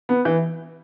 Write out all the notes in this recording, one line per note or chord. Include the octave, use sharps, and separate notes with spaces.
B3
E3